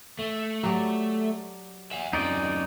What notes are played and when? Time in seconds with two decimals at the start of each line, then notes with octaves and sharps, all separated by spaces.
0.19 A3
0.63 F#3 G4 D5
1.91 E5 F#5
2.13 F#2 C4 D#4 D5